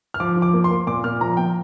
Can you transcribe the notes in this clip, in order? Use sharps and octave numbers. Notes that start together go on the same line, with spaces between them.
F6
F3 D6
F3
D6
A#3
C6
A#3
A#2 D6
A#2 F6
F3 A#5
A#2 G5